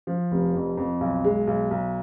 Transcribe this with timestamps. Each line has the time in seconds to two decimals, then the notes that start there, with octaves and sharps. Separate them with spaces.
0.07 F3
0.31 F1
0.55 F2
0.77 F2
1.01 B1
1.24 G#3
1.47 B1
1.71 B1